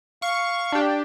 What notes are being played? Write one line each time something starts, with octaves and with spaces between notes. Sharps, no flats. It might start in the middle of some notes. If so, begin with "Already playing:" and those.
F5 C#6
D4 G4